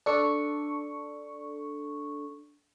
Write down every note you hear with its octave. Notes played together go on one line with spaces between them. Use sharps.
D4 A4 C#6